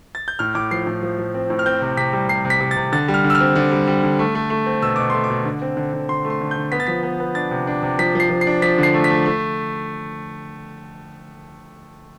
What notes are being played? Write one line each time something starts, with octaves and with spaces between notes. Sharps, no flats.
A6
G6
A2 F6
A2 D6
F3 C7
A2
F3
F3
C4
A2
F6
C4 G6
C3
C3 B6
G3
C3 C7
C3
B6
C3
A6
C3
D3 A6
G3
F6
D3
E6
F6
C4
D3
G3
G3
D3
A3
A3
A3
C4
B2 E6
B2 D6
A3 C6
D6
B2
D3
C4
D3
D3
D3 C6
A3
C6
D3
D3 G6
B3 B6
A6
F3 B6
B3
B3
D4 A6
C3
D4
C3
F3 B6
F3 C7
F3
C7
D4
F3 B6
D3 C7
A3
B6
A3
A3